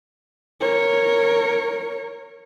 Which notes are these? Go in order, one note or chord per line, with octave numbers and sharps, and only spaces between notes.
A#4 C#5